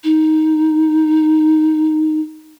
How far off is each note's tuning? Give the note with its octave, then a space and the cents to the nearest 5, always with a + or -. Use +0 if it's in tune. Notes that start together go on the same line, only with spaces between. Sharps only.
D#4 +5